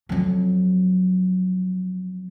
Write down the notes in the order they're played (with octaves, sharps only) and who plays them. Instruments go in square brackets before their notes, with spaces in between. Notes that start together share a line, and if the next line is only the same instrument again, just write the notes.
[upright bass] F2 F#3